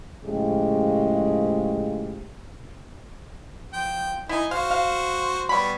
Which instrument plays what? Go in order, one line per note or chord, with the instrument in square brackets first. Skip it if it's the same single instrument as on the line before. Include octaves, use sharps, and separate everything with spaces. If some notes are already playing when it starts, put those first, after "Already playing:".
[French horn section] A2 C#3 F3 G#3 G4
[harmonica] F3 G5
[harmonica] D#4 G#5 [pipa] E4
[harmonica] F#4 C5 [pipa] F5
[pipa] F5
[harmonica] G3 B3 C#5 [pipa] B5